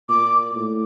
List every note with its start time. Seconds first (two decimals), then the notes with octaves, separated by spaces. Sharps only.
0.09 A#2 D6
0.56 A2